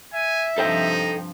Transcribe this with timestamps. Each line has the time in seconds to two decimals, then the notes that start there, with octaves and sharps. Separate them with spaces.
0.14 E5 G#5
0.58 G2 C3 F3 D#4 A4 C5 G5